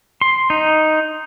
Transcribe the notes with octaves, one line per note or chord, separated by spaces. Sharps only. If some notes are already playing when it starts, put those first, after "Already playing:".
C6
D#4